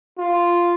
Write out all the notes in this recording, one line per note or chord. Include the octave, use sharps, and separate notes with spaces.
F4